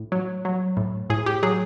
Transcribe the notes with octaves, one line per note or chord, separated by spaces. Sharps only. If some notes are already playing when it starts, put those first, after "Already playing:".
Already playing: A2
F#3
F#3
A2
A2 G#4
G4
F#3 G#4